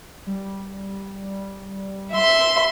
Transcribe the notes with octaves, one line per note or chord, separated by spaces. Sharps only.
G3
E5 C6 E6